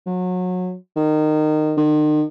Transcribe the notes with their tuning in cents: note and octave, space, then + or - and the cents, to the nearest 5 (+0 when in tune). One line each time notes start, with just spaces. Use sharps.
F#3 -25
D#3 -20
D#3 -40